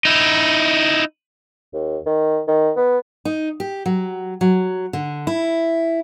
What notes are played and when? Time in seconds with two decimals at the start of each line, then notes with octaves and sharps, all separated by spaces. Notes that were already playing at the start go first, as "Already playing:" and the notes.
0.05 D#4 E4
1.74 D#2
2.06 D#3
2.48 D#3
2.77 B3
3.25 D#4
3.60 G4
3.86 F#3
4.41 F#3
4.93 D3
5.27 E4